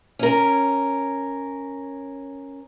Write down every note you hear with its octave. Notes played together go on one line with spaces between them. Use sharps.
C#4 A#4